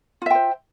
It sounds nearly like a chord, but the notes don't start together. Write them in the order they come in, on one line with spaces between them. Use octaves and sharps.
F4 E5 G5 C5